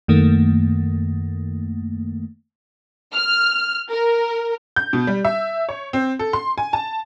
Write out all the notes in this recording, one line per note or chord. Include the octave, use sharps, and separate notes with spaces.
F#2 D#3 A3 A#3
F6
A#4
G6
B2
G3
E5
C#5
C4
A4
C6
G#5
A5